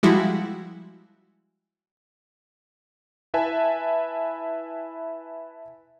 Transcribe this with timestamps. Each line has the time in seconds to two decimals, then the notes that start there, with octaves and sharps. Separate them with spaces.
0.03 F3 G3 G#3 E4 F#4
3.34 E4 B4 E5 G#5 A5